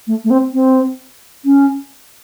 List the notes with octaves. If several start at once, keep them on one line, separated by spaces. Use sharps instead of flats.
A3
A3
C4
C4
C#4